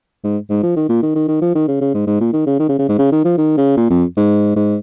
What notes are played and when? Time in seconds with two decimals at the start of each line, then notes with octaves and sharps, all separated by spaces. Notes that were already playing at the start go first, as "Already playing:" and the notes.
0.24 G#2
0.50 G#2
0.63 F3
0.76 D#3
0.89 A#2
1.03 D#3
1.15 D#3
1.28 D#3
1.42 F3
1.55 D#3
1.68 C#3
1.81 C#3
1.94 G#2
2.07 G#2
2.21 A#2
2.33 D#3
2.47 C#3
2.59 D#3
2.69 C#3
2.79 C#3
2.89 G#2
2.99 C#3
3.12 D#3
3.25 F3
3.38 D#3
3.58 C#3
3.77 A#2
3.90 F2
4.17 G#2
4.56 G#2